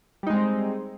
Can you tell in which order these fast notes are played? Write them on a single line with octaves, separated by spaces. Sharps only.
G3 D#4 G#3 C4